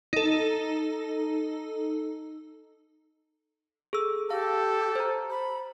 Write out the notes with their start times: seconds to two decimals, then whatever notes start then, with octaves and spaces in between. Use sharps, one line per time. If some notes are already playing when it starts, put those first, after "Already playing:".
0.13 D#4 A4
3.93 G#4 A4 E6
4.31 G4 A4 F5
4.95 C5 A#5
5.30 B5